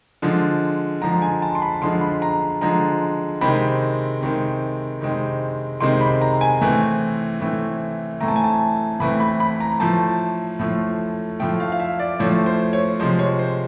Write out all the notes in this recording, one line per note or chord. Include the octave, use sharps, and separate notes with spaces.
D3 F3 G#3
D3 F3 G#3 A#5
G#5
A5
C6
B5
D3 F3 G#3 C6
B5
A#5
D3 F3 G#3 A#5
C3 D#3 G#3 C4 B5
C3 D#3 G#3 C4
C3 D#3 G#3 C4
C3 D#3 G#3 C4 C6
B5
A#5
G#5
A2 E3 A3 C4
A2 E3 A3 C4
A2 E3 A3 C4 A#5
A5
G#5
A5
A2 E3 A3 C4 B5
B5
B5
A#5
A2 F3 A3 A5
A2 F3 A3
A2 F3 A3 G5
F5
F5
E5
D5
A2 F3 A3 C#5
C5
C#5
C3 F3 G#3 C5
C#5
C5